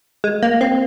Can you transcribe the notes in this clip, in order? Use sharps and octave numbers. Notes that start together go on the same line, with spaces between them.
G#3
A#3
C4